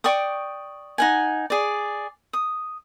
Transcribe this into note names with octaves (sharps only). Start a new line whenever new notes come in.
D5 G5 C#6 D#6
D#4 F#5 G#5
G#4 D5
D#6